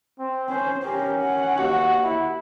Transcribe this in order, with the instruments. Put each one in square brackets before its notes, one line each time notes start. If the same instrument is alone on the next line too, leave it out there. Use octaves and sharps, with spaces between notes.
[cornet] C4
[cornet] C#4 [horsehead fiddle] C5
[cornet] C#4 [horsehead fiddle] G4 A#4
[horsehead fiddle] F#5
[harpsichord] D#2 [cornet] F#4
[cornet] E4